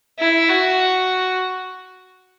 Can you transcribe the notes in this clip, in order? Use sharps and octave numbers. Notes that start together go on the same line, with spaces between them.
E4
F#4